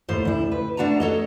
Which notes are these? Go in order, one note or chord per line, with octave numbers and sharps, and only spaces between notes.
D#2 A2 C5
D2 E4
B4
A3 D4 F#4 A5 A#5
A4 C#5 D#5